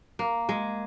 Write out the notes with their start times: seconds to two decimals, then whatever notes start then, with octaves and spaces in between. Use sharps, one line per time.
0.19 A#3
0.49 G#3